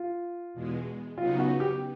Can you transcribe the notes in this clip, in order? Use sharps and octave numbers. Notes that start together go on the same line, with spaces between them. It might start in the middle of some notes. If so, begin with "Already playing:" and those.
Already playing: F4
E2 B2 G#3
C#3 F#3 B3 D#4 F4
F#4
G4